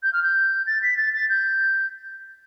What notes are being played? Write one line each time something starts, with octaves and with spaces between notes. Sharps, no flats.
G6
F6
G6
A6
B6
A6
A6
G6